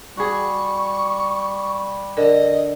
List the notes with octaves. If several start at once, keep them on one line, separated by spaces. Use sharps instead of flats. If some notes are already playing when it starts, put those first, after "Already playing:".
G3 F#4 G#4 C#6
D3 A#4 D#5